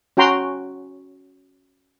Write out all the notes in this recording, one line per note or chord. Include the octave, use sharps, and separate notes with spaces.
C#4 F#4 G5 A#5 C6